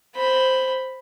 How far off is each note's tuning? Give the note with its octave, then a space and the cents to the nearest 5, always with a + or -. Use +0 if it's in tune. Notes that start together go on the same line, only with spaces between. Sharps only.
C5 +0 B5 +5